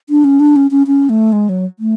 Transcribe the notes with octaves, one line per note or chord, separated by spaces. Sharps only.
D4
C#4
D4
C#4
C#4
C#4
A3
G#3
F#3
A3